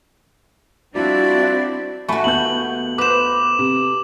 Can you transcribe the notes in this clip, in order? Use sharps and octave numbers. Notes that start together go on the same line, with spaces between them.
F3 G3 C4 D4 E4 F#4 D5
A3 F#4 G#5 B5 C#6
D#2 B3 G6 F#7
B4 C5 D6 E7
C3